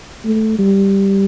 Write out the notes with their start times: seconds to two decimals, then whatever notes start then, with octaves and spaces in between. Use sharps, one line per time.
0.25 A3
0.59 G3